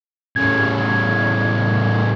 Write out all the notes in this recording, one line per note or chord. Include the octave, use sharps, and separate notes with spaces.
A2 C#3 G#6